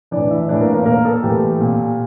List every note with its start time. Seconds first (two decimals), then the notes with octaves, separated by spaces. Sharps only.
0.11 A2 E3 D4 D5
0.30 E4 E5
0.48 A2 E3 D4 D5
0.61 A#3 A#4
0.74 A#3 A#4
0.86 A#2 A#3 A#4
1.05 A4
1.23 A2 E3 G4
1.61 A#2